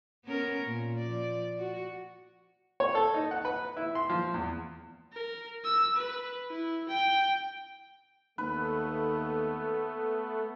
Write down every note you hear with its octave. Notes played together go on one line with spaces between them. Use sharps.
B3 C#4 A#4
A#2
F3 D5
F#4
C#5
A4
D#4
F#5
B4
E4
C6
F3
E2
A#4
E6
B4
E4
G5
D#2 A3 B3 B4